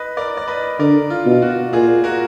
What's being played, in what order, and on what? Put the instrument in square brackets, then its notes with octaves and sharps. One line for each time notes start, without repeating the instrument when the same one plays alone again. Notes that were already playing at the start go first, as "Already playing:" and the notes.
Already playing: [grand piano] B4 D#5
A#4 D5
D5
B4 D#5
[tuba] D3 [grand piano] A#4 D5
[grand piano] F4
[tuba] B2
[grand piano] F4
F#4
[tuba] A#2 [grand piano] F4 G#4
[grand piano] F#4 A#4